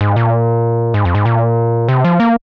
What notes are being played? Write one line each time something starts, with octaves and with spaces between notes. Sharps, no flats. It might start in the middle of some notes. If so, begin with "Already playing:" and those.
G#2
A#2
G#2
F2
G#2
A#2
C3
F3
A#3